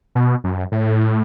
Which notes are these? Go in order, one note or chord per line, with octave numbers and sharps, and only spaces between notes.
B2
F#2
A2